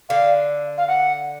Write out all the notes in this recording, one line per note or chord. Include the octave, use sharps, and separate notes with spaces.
D3 F5
F5
F#5